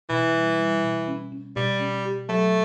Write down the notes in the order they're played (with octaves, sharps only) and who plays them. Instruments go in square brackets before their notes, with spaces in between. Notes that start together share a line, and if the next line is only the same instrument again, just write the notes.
[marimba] B2 [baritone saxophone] E3
[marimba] G3
G3
B2
C#4
C#4
[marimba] B2 [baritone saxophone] G3
[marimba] C#4
G4
[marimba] F#3 [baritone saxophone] A3